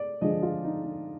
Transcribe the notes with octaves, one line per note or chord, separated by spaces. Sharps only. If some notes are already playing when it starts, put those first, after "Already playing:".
Already playing: D5
D3 F3 G#3 D#5
F4
D#4
D#4